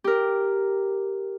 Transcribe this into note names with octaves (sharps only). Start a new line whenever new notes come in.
G4 A#4